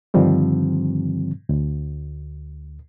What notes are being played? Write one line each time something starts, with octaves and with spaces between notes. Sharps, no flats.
G2 D3 D#3 F3 G3 C4
D2